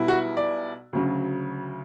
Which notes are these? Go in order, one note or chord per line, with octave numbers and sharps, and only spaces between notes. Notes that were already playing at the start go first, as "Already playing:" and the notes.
Already playing: B1 B2 G3 B3 E4
F#4
D5
D2 C#3 F#3